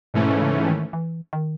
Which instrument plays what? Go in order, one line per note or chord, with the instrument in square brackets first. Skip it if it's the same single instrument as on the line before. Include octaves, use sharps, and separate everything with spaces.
[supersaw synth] G#2 E3 A3 C#4 [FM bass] B2
[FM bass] C#3
D#3
E3
D#3